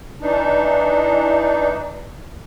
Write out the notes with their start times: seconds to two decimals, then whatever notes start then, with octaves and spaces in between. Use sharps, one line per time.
0.22 E3 D4 D#4